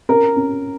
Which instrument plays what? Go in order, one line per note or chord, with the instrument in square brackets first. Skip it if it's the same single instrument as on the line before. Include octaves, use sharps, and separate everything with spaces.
[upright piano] C#4 A#4
C#4